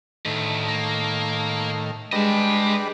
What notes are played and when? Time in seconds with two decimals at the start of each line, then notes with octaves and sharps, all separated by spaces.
0.25 D2 A2 D#3
0.69 A#3
2.12 G3 G#3 D4 B4 D#5 A5